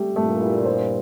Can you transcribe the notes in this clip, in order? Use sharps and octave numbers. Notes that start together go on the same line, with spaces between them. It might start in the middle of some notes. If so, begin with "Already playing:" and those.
Already playing: G3 A3 G4
G2 A#2 A3
E4
C5